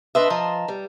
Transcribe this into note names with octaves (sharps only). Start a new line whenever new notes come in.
D4 B4 D#5 E5 C6 D#6
F3 D#5 A5 A#5
G3